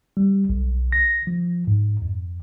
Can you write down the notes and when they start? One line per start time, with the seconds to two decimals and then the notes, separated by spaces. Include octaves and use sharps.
0.17 G3
0.49 B1
0.92 A#6
1.27 F3
1.67 G#2
2.02 F2